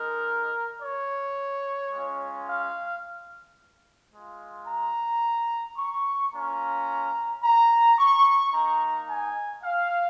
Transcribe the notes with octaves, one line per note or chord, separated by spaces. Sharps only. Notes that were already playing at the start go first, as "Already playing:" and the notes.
Already playing: G#3 D#4 A#4
C#5
G#3 C#4 F4
F5
G#3 F4
A#5
C#6
A#3 C#4 F4 A#5
A#5
C#6
A#3 D#4 A#5
G#5
F5